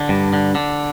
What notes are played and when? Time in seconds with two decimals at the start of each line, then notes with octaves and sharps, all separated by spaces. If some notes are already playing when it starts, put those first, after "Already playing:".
Already playing: D3
0.09 G2
0.33 D3
0.55 D3